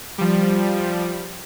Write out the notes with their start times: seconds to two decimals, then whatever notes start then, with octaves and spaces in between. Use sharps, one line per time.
0.18 F3 G3